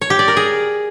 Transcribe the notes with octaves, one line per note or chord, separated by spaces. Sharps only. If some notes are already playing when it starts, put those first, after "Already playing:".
C#5
G4
D5
A#4
G#4